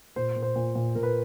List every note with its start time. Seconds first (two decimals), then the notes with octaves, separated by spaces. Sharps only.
0.16 A#2 C5
0.36 A#2
0.42 C5
0.56 A#2
0.75 A#2
0.95 A#2 A#4
1.03 B4